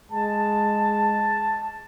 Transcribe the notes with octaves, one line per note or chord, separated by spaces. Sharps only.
G#3 A5